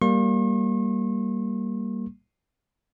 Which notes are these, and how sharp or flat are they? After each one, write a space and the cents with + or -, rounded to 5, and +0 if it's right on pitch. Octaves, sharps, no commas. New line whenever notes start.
G3 +0 A#3 +0 C#6 -45